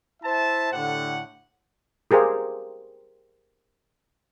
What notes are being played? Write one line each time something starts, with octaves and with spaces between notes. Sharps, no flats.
E4 C5 E5 A5
A2 D3 G4 F#5
G4 G#4 A#4 C5 F5